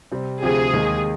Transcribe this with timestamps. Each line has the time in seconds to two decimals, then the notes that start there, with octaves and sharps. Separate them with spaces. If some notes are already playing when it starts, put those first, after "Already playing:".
0.12 C3 G3 C4
0.42 D2 C3 F3 C4 G4 G#4
0.73 D#2 D#3 G#3